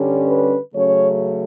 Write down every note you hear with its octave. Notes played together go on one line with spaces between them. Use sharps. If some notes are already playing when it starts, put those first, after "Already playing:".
Already playing: G2 D3 G3 C#4
B4
C#3 F#3 A3 C#4 C#5